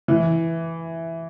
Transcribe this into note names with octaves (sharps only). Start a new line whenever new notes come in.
E3